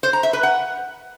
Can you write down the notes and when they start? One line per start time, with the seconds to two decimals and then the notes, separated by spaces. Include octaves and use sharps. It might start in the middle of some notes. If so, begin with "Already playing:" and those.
0.03 C5
0.13 A#5
0.23 E5
0.33 B4
0.43 F#5